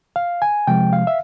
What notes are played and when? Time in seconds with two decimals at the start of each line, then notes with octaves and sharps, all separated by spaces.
0.16 F5
0.42 G#5
0.67 C3 F3 G#3 G5
0.93 F5
1.07 E5